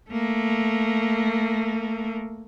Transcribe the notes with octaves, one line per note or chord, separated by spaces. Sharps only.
A3 A#3